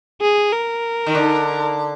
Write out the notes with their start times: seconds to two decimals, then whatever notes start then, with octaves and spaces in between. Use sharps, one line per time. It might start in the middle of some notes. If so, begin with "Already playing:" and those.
0.22 G#4
0.53 A#4
1.06 D#3
1.15 D3